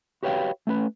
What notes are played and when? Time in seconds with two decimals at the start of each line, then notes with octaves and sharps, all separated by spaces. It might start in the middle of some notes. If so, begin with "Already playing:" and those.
0.23 F#4 G4 B4 C#5 F5 G5
0.67 A3 C#4 B4